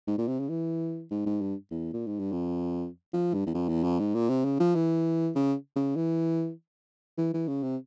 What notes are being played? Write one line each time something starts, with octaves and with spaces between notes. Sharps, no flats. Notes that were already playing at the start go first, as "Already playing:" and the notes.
G#2
A#2
C3
C#3
E3
G#2
G#2
G2
E2
A#2
G#2
G2
F2
F3
G2
E2
F2
E2
F2
G#2
A#2
C3
C#3
F3
E3
C#3
C#3
E3
E3
E3
C#3
C3